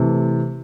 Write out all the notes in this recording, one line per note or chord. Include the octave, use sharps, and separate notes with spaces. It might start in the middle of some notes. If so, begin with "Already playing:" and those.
Already playing: C3 E3 A3